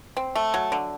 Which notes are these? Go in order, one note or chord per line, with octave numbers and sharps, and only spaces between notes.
C4
A3
F#3
D3